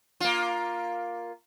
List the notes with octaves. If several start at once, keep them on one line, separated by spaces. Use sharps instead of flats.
A#3 F4